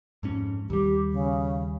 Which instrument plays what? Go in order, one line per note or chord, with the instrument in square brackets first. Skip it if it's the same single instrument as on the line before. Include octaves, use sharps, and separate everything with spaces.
[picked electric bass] F2 G#2 C#4
[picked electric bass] D#2 G3 [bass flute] G4
[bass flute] C#3